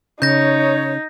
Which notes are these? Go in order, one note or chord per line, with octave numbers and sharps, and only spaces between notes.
C#3 D#4 C#5 G6 A#6